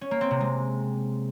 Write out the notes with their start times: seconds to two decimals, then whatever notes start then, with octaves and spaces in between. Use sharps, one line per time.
0.01 C#4
0.11 A#3
0.21 C4
0.31 C3
0.41 G#3